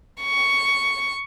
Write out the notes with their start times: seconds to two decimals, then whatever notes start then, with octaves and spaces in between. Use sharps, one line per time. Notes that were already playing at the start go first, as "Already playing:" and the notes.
0.23 C#6